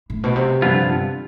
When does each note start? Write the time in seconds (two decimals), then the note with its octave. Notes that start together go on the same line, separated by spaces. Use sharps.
0.10 A2
0.23 B2
0.36 C3
0.62 G2 D3 F3 B3 F4